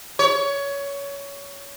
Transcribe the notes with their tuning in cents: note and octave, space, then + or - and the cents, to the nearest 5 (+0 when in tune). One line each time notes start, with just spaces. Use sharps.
C#5 +20